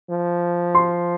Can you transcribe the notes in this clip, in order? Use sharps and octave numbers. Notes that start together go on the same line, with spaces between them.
F3
C6